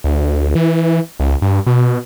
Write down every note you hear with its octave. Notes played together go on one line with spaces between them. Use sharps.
D2
E3
C#2
G2
B2